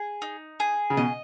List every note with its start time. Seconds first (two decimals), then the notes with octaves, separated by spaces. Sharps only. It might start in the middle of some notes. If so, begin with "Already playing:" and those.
Already playing: G#4
0.22 D#4
0.60 G#4
0.90 C#3
0.97 B2 D#5